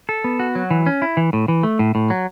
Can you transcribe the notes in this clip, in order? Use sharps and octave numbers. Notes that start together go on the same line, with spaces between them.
A4
B3
F#4
F#3
E3
C#4
E4
E3
A2
E3
A3
A2
A2
F#3